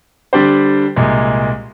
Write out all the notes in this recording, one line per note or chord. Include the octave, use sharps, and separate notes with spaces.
D3 G3 D4 G4 C5
C2 A#2 G#3